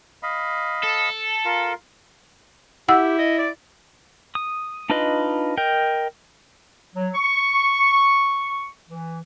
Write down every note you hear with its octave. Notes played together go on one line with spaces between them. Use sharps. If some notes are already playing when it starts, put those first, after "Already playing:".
D#5 F5 B5
A4
F4 A#4 F5
E4 G4 F#5 E6
D#5
D5
D#6
D4 D#4 F4 B4 D#5
A#4 D#5 G5
F#3
C#6
E3